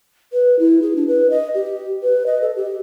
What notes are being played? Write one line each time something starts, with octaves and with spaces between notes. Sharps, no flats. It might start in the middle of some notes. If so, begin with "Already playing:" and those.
B4
E4
G#4
D4
B4
D#5
G4
B4
D#5
A4
G4